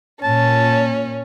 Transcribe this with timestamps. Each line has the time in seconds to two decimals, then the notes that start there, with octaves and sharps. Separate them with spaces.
0.23 A#2 C#4 A5